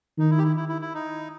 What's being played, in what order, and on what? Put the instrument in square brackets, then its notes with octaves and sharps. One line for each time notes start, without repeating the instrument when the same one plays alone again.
[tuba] D#3 [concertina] D#4
[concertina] E4
G4
E4
E4
E4
E4
D#4